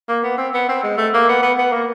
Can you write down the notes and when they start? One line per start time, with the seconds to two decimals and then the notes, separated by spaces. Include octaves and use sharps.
0.08 A#3
0.23 B3
0.38 C4
0.54 B3
0.69 C4
0.83 G#3
0.97 A3
1.14 A#3
1.28 B3
1.42 B3
1.58 B3
1.72 A#3